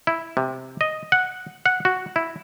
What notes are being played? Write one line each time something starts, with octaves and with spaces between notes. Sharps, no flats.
E4
C3
D#5
F#5
F#5
F#4
E4